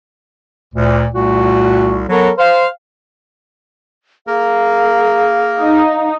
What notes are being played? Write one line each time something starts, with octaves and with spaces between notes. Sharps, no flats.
D2 A#2
C2 A#2 A3 F#4
F#3 B3 A4 A#4 C#5
C5 F5
A#3 G#4 A#4 F5
D#4